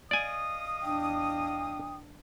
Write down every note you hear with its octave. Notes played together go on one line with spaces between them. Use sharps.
D5 D#5 F5 G#5 D#6
E2 D4 G5